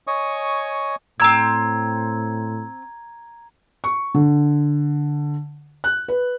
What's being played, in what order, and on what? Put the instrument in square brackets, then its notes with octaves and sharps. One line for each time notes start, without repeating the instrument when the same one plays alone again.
[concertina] C#5 D#5 G#5 C#6 D#6
[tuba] A2 [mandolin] C4 E6 [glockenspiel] A#5 G#6
[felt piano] C#6
D3
F#6
B4